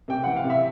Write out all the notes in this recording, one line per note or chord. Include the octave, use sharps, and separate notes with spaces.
C3 G5
E3 F#5
F5
C3
E5